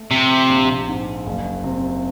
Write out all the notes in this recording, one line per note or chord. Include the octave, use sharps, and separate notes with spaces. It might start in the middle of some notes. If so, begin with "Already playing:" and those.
Already playing: A3
C3 F3
A#1
G#2
F#1
C3